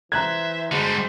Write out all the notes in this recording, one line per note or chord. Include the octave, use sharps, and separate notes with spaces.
E3 C5 E5 A#5 F#6 G#6
D3 G3 G#3 F#4 C5